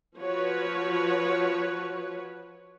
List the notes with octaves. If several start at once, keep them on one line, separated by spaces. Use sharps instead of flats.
F3 F#4 B4 C#5